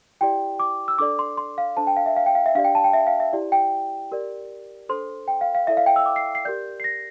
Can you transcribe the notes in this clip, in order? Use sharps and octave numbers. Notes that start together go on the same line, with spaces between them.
E4 G4 D5 G5
D6
E6
D4 A4 D5 D6
C6
C6
F5
D4 A4 C5 A5
G5
F5
E5
F5
G5
F5
E5
D4 G4 D5 F5
G5
A5
G5
E5
F5
E5
E4 G4 D5
G5
G4 A#4 D5
D4 A4 C5 C6
G5
F5
F5
E4 A4 D5 E5
F5
G5
E6
D6
C7
C7
G4 A#4 D5 G6
C7
A#6